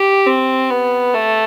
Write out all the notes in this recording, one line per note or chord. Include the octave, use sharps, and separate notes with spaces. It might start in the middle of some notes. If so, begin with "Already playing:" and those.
Already playing: G4
C4
B3
A3